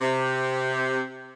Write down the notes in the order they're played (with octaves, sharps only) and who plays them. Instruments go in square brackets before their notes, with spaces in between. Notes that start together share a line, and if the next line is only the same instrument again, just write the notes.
[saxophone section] C3